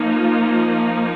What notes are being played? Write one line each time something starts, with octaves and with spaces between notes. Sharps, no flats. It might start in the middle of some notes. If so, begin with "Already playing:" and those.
Already playing: F3 A#3 D#4
F4